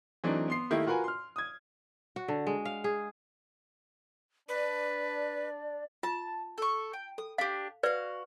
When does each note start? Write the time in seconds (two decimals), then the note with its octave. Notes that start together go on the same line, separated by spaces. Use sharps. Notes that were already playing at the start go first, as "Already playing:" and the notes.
0.24 E3 F#3 A3 C4 D4 D#4
0.48 B3 C6 C7
0.71 D#3 A3 A#3 E4 G4
0.87 F4 F#4 A#4 B4 G#5
1.04 C6 F6
1.36 D#6 G#6
2.16 F#4
2.28 D3
2.47 G#3
2.65 F5
2.84 G#4
4.49 D4 B4 D5
6.03 F4 A5
6.58 A4 C#6
6.93 G5
7.18 A4 D#6
7.38 D4 G4 F5
7.83 F#4 B4 D5 F5